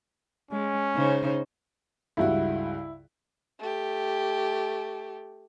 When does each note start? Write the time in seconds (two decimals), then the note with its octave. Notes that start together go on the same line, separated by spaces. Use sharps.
0.51 G#3 C#4
0.94 C#3 D#4 C5
2.17 C#2 G2 E4 F#4
3.59 A3 G4